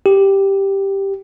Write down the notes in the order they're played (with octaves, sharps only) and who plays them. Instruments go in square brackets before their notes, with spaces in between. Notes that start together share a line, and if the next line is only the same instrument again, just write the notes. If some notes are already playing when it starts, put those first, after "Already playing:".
[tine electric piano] G4